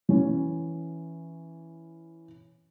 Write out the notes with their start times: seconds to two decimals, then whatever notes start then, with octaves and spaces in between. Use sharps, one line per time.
0.09 E3 C#4